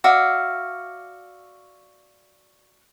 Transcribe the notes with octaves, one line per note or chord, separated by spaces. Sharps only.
F#4 D5 E5 F5